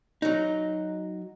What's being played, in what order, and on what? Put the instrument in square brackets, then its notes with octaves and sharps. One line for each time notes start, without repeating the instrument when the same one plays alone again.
[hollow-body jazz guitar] F#3 D#4